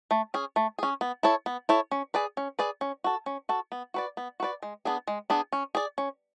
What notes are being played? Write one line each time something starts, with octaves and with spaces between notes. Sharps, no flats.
A3
C#4 G#4
A3
C#4 G#4
B3
E4 A4 C#5
B3
E4 A4 C#5
C#4
G#4 B4 D5
C#4
G#4 B4 D5
C#4
F#4 A4
C#4
F#4 A4
B3
F#4 B4 D5
B3
F#4 B4 D5
G#3
B3 D4 G#4
G#3
B3 D4 G#4
C#4
G#4 D5
C#4